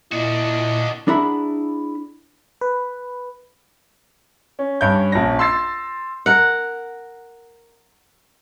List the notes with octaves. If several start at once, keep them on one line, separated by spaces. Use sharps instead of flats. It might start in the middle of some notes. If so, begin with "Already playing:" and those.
A#2 D4 E4 F#4 D#5
D4 E4 G#4 F#5 A#5 B5
B4
C#4
G2 C#4 G6
A#1 C#4 A#6
C6 E6 A6 C7
A#4 F#5